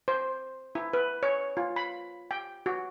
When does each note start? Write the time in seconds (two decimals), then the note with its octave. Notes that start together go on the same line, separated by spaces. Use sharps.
0.08 C5
0.75 E4
0.93 B4
1.23 C#5
1.57 F4
1.76 B5
2.31 G5
2.66 F#4